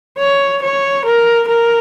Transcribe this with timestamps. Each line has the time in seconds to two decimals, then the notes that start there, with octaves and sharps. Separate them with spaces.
0.18 C#5
0.62 C#5
1.05 A#4
1.47 A#4